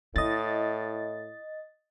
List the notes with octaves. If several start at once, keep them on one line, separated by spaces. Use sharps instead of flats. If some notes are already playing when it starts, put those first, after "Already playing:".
A2 E4 D#5 A6